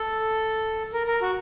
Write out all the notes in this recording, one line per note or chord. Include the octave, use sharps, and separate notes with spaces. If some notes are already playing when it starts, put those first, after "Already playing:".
Already playing: A4
A#4
A#4
F#4